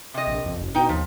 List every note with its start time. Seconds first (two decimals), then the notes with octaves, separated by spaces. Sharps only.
0.14 C3 D#5
0.26 A#1
0.45 F2
0.61 F#1
0.75 B2 D#4 G5
0.89 D#2 F3